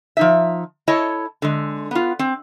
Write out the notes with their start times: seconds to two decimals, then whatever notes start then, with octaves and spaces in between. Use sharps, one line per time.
0.17 F3 D#4 E5
0.88 E4 A4 C#5 D#5 A5
1.42 D3 G#3
1.91 B3 F4
2.19 C4